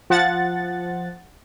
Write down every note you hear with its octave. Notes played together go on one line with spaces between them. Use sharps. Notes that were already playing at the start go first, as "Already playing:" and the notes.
F3 F#5 A6